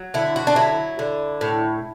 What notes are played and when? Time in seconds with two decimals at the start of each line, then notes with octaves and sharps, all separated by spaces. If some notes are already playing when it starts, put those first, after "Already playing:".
Already playing: F#3
0.14 D3 E4
0.36 F#4
0.47 D4
0.56 F#3 E4
0.99 D3
1.41 A2